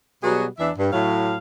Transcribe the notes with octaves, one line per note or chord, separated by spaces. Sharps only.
B2 F#3 G3 B3 F#4 G#4
E2 E3 D4 E5
G2
A2 F#3 F5